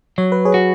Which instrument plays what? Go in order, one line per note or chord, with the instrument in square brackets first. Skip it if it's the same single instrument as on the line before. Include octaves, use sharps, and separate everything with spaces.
[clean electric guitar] F#3 [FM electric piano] C#5
[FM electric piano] B4
G#4 C#5
[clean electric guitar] F#4